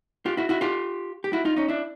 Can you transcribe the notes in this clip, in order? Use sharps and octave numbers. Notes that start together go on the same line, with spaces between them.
F4 G4
E4 F#4
E4 F#4
F4 G4
G4
E4 F#4
D#4 F4
C#4 D#4
D4 E4